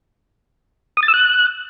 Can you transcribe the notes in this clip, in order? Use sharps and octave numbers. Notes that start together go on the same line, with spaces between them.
D#6
A6
E6
F#6